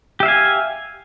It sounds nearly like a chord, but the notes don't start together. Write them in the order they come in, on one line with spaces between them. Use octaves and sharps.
G4 E5 F5 G#5